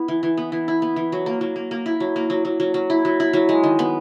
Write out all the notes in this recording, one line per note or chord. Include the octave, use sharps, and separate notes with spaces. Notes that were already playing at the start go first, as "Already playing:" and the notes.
Already playing: B3 E4
E3
E3
B3
E3
E4
B3
E3
F#3
A#3
F#3
A#3
A#3
E4
F#3
A#3
F#3
F#3
F#3
F#3
E4
F#3
E4
F#3
G#3
D#3
B3